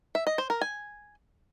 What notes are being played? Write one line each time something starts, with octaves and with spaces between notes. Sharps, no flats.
E5
D#5
C5
A#4
G#5